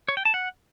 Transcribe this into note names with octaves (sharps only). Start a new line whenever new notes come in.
C#5
G5
A5
F#5